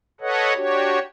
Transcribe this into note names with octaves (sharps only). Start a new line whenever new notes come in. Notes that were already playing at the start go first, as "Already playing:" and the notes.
A4 B4 C#5 D#5 F#5
D4 F#4 G4 C#5